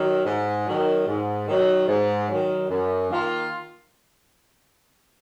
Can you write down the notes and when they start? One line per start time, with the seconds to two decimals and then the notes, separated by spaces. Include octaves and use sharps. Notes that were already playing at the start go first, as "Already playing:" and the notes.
Already playing: D#3 F#3
0.25 G#2
0.67 D#3 F#3
1.07 G#2
1.48 D#3 F#3
1.88 G#2
2.29 D#3 F#3
2.69 F#2
3.10 D#3 A#3 F4